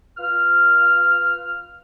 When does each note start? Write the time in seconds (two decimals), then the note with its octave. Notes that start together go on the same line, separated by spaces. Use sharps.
0.18 F4 B4 F6